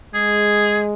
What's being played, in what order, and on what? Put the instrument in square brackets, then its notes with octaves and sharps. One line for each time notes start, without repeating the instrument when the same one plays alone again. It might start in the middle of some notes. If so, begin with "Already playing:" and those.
[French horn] G#3 [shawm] G#4